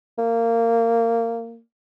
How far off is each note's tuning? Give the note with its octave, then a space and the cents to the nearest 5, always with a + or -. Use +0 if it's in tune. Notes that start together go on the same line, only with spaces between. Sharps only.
A#3 -20